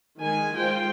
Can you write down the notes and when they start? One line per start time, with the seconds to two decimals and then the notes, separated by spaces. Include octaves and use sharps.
0.20 D#3 G#3 G#5
0.56 G#3 F4 C5 G5